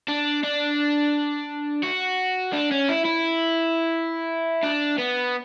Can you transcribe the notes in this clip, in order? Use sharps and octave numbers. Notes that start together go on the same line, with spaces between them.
D4
D4
F#4
D4
C#4
E4
E4
D4
B3